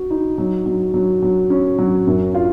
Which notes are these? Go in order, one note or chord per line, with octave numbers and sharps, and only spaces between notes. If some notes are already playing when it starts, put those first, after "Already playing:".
Already playing: F#4
D#4
F#3
F#3
F#3
F#3
C#4
F#3
F#2
F4